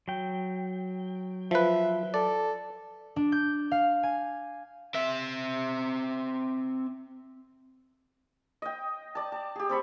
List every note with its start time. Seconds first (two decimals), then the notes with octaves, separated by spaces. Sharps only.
0.08 F#3 G5
1.51 F3 B4 E5
2.14 A4 D5
3.16 D4
3.32 G6
3.71 F5
4.03 G#5
4.95 C4 E5
8.62 D#5 G5
9.15 D5 A5
9.32 A5
9.56 G4 G#4
9.69 C4 A4 B5 C#6